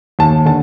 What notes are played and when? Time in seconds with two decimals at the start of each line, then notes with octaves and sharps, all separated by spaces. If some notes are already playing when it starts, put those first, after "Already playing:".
0.19 D#2 A5
0.45 D3 A5